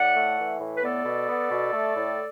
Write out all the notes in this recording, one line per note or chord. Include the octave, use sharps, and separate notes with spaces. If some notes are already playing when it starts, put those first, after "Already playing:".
Already playing: A2 D5 F#5
A3
E3
A2
B4
B3 A4 D5
B2
B3
B2
A3
A2